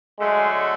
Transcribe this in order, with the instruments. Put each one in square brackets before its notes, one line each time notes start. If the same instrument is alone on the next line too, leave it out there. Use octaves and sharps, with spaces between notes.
[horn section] D3 F#3 A3 D4 F#4 [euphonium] G#3